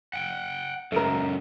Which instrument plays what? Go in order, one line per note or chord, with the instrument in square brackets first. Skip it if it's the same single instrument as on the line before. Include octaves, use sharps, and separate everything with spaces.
[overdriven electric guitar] F#5 G5
[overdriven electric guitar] C#2 F#2 [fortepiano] A3 A#4